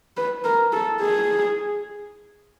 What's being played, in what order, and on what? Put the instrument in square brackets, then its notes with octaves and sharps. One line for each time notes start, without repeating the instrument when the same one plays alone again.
[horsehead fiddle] B4
A#4
A4
G#4